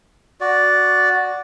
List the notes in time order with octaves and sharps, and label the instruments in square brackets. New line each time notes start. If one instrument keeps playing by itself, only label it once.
[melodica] F#4 D5